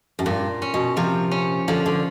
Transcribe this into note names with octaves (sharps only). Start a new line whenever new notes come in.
F#2
G2 A#2
C#4
B2
C3 F3
C#4
D3 F3
D3